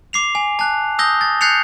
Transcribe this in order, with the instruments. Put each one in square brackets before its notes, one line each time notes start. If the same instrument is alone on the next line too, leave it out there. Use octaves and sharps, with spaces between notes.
[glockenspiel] D6 C7 F7
G#5
A5 F#6
D#6 E6 G6 A#6 G7
A6
F#6 G6 A6 C7 C#7 F7